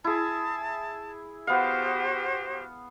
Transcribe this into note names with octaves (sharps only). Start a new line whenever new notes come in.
E4 G#4 A5
B3 F#4 G4 C5 F5